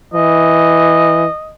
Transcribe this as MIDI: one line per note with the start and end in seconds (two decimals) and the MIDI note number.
0.14 1.26 52
0.14 1.54 75